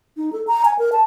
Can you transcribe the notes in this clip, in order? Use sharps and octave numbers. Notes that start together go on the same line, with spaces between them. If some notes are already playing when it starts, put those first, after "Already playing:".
D#4
A4
A#5
G#5
A#4
A5